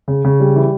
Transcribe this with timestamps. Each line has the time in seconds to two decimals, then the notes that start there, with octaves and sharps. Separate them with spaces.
0.08 C#3
0.25 C#3
0.40 G3
0.56 E3